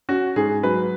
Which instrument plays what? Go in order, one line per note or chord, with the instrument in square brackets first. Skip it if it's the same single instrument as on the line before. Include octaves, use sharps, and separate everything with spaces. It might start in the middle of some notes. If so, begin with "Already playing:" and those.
[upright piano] C#4 [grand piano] F#4
[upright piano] G#2 [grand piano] G#4
[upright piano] F#3 [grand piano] B4